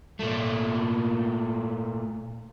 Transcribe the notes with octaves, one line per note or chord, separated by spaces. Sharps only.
A#2 A3